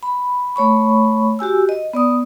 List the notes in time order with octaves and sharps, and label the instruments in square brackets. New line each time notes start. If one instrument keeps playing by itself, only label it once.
[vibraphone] B5
A3 C#5 B5 C#6
F#4 G4 G#5 E6
D#5
B3 D5 D#6